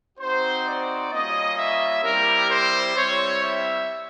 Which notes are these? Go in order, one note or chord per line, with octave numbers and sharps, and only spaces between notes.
C4 D#4 F#4 C5
D5
G3 A#3 C#4 F4 D#5
E5
G3 C4 E4 G4 A#4
C5
G3 C4 E4 C#5
E5